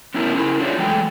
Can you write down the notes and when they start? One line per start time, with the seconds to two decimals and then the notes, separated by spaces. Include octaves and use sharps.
0.14 B3 C#4 E4 A#4
0.35 C#4 E4 A#4
0.60 D4 F4 G#4 C#5 D5 E5
0.79 E3 F#3 G#3 A3 G5